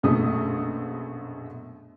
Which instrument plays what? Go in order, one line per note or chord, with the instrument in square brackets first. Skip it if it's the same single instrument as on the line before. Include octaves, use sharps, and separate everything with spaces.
[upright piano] A#1 F#2 B2 A3 D#6